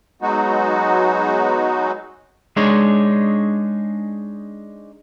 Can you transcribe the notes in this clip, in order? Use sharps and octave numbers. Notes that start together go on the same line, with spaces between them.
F#3 G#3 B3 D#4 F#4
G#3 D4 D#4 G#4 C#5